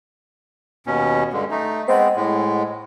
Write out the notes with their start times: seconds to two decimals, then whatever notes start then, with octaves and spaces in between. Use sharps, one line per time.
0.87 D#2 B2 C#4
1.33 G2 D3 G#3
1.51 A3 D#4
1.88 G#3 B3 C4 C5 D#5 F#5
2.16 A2 G#3